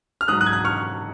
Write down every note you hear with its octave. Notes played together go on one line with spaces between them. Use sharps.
F6
G#2 F#3 D#6 F#6
D#6 F#6
G#6
D#6 F#6
C#6 F6